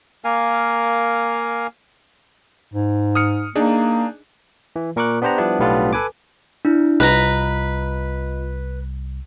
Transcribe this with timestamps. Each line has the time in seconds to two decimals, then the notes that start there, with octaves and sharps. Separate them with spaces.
0.24 A#3 A#4 F5 G#5
2.72 G#2
3.15 D#6 F6 C#7
3.55 A#3 D4 D#4 G#4
4.76 E3
4.96 A#2 A#4 C#6 D6 F#6
5.22 B3 D4 G4 C5 F#5 A#5
5.38 F3 G3 B3 D4 E4
5.59 B1 A2 G3 B3 D4 F4
5.93 A4 B4 G#5 D6
6.65 D4 E4
7.00 C2 F4 B4 D#5 A#5